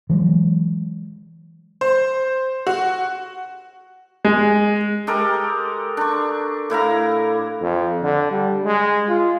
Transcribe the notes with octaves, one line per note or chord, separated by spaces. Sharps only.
E3 F#3 G#3
C5
F#4
G#3
G#3 G4 A4 A#4
D4 C#6
A2 E4 F5 A#5
F2
D3
G3
G#3
F4